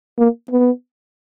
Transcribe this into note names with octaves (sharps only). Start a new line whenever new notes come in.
A#3
B3